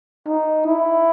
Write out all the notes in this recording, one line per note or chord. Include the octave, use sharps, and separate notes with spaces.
D#4
E4